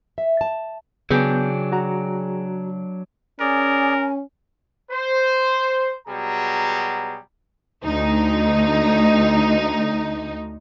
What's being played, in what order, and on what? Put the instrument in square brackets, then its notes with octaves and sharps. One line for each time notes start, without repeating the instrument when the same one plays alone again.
[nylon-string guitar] E5
A5
[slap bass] C#3 [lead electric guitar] F#3 D4 [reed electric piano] B3 G6 [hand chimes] G#4 G5 G#5
[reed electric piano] F#4 A#5
[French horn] C#4 [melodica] G#4 D5 [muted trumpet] A#4 [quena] G#5
[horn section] C5
B2 F#3 G3 G#4 A#5
[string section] D2 D#4